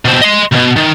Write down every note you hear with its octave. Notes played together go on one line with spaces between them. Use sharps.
B2 C4
D#5 C6
D2 B2
D#3